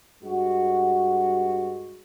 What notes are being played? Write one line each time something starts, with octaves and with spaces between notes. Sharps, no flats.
G2 G#3 F#4